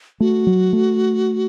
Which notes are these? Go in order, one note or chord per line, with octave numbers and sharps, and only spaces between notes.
A3 F#4
F#3
A3